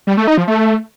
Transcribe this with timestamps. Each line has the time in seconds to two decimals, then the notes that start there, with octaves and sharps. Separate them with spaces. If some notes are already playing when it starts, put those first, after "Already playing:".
0.07 G3
0.17 A3
0.27 D#4
0.38 F3
0.48 A3